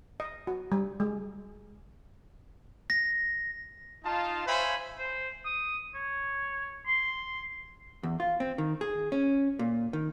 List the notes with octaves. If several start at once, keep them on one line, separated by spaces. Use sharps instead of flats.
D#5
F#4
G3
G#3
A#6
D#4 F4 A5
C5 C#5 E5 F5 G#5 B5
C5
D#6
C#5
C6
E2
F4
C4
D#3
G#4
C#4
A#2
D#3